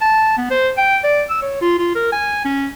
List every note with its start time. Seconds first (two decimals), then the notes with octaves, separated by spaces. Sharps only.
0.01 A5
0.38 B3
0.51 C5
0.78 G5
1.04 D5
1.30 E6
1.42 C#5
1.61 F4
1.78 F4
1.95 A#4
2.12 G#5
2.45 C#4